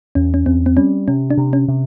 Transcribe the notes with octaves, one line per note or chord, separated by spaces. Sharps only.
E2 C#4
C#4
E2 C4
C4
G3 C#4
C3 C#4
D4
C3
C#4
C3